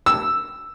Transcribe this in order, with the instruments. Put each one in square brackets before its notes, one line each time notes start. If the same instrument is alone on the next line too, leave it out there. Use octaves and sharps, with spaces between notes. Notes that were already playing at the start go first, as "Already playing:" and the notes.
[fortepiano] E6